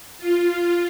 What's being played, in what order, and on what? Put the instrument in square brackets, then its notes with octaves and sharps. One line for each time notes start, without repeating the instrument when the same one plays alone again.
[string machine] F4